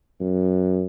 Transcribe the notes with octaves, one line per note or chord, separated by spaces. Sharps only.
F#2